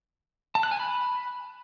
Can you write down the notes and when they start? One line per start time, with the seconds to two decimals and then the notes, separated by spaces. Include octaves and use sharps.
0.55 A5
0.63 F#6
0.71 G#5
0.79 B5